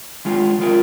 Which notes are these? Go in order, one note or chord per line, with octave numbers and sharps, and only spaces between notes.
G#2 D#3 G#3 F4
D#3 G#3 F4 A#4